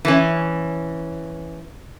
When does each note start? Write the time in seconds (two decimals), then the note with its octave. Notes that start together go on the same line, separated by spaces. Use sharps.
0.05 E3 C#4